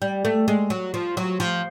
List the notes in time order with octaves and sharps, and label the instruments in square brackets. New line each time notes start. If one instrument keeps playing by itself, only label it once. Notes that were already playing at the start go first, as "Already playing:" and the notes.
[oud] G3
A3
G#3
F#3
F3
F#3
F3